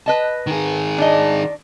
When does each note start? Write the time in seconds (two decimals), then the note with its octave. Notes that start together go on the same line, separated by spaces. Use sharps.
0.06 B4 D#5 A5
0.47 D#3 G#4
0.98 D4 D#5